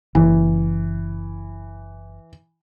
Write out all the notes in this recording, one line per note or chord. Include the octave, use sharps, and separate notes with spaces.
F#1 E3